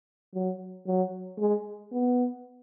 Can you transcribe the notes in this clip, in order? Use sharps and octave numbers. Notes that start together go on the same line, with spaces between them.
F#3
F#3
G#3
B3